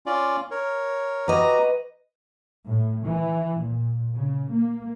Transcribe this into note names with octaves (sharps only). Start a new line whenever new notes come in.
C#4 F4 D5
A#4 C#5
F#4 G4 B4 D#5 A#5
A2
E3
A#2
C#3
A#3